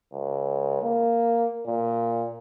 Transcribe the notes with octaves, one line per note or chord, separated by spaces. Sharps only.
C#2
A#3
A#2